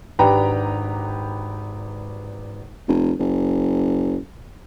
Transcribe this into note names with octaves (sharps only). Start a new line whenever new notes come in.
G#1 D4 G4 B4 G5 A#5
F1
F#1